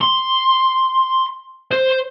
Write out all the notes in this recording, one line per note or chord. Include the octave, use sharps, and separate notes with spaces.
C6
C5